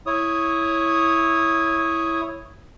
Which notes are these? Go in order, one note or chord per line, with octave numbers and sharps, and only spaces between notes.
E4 C#5 D#6